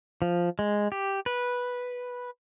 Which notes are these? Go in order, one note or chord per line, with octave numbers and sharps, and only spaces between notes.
F3
G#3
G4
B4